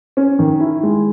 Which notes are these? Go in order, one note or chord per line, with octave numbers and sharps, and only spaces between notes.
C#4
D#3
E4
G#3